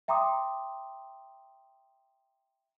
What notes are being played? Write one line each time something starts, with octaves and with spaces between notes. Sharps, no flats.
E5 G5 A#5 C6 D6 D#6